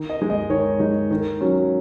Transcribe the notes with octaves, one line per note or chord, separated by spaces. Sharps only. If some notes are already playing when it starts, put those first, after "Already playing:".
Already playing: D#3
D#5
G#3 D#4
D#5
D#3 C#5
G#3 D#4
D#3
F#3 C#4